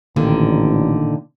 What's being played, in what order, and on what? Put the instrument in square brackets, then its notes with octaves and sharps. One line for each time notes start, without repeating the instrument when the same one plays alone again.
[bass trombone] A1 [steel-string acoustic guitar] A#2 D3 D#3